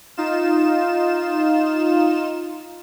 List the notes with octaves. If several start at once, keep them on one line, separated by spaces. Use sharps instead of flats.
D#4 F4 E7